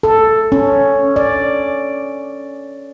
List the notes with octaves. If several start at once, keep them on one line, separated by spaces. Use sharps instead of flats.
A4
C#4
D5